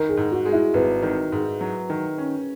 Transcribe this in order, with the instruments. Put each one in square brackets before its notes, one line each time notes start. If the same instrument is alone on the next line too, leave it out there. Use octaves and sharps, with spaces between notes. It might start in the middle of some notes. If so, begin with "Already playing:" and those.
Already playing: [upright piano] D#3 [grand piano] A#4
[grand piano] G#4
[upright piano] G#2
[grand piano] F#4
[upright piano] G#3
[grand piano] E4
[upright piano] G#1 [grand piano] B4
[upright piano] D#3
G#2
F#3
D#3
C#4